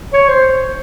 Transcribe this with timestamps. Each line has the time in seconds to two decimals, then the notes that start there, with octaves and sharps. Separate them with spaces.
0.14 C#5
0.29 C5